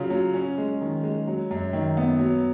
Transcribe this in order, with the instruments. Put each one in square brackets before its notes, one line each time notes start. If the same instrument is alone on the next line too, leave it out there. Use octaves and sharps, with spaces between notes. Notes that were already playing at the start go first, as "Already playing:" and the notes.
Already playing: [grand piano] C#3 F#3 F4
F#3
C#4
G#3
D#3
G#3
F#3
F#2
D#3
B3
F#3